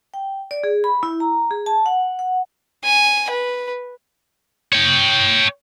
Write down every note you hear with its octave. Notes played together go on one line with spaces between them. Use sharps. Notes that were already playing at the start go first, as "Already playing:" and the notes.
G5
D5
G#4
B5
E4
A#5
G#4
A5
F#5
F#5
G#5
B4
C#5 G5